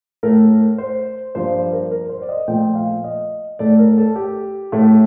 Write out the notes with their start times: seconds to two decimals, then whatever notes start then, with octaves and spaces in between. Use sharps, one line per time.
0.23 A2 A3 A#4
0.78 C5
1.35 G2 F3 A#3 C5
1.54 C5
1.72 A#4
1.91 A#4
2.09 C5
2.22 D5
2.29 D#5
2.48 A#2 F3 A3 G5
2.75 F5
3.04 D#5
3.59 A2 A3 D5
3.79 A#4
3.98 A4
4.16 G4
4.72 A2 A3